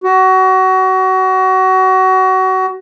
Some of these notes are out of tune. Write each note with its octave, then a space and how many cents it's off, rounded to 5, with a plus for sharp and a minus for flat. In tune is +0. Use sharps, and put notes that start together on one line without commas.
F#4 +25